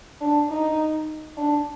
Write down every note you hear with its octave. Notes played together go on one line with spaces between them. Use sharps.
D4
D#4
D4